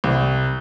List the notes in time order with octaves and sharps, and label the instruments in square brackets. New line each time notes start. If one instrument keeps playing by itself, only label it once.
[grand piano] C2